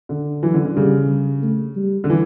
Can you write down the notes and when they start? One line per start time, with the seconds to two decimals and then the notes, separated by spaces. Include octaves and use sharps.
0.09 D3
0.43 E3 F#3
0.54 D3
0.65 D3
0.76 C#3 G3
1.43 A3
1.76 G3
2.04 D3
2.10 E3